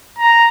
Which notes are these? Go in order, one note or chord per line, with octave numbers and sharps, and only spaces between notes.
A#5